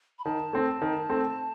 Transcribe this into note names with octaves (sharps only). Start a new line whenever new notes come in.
B5
D#3 A5
A3 C4
D#3
A3 C4